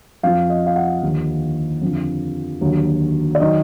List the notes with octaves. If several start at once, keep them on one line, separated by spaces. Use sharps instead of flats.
F2 F3 F5
D#5
F5
F#5
D#2 D3 F3
F2 D3 F3
D#2 D3 F#3
D5
D#3 F#3 D#5